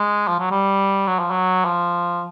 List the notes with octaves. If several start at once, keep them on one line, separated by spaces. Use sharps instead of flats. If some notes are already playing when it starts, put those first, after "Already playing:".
Already playing: G#3
F3
F#3
G3
F#3
F3
F#3
F3